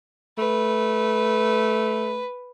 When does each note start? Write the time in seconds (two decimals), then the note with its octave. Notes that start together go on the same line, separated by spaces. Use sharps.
0.38 A3 B4